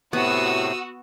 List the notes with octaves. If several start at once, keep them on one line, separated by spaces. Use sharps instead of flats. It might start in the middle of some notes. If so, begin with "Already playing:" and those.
A2 C3 B3 F#4 D#6 E6